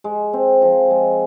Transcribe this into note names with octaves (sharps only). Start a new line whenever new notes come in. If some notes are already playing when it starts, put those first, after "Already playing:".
G#3
C4
F3
G#3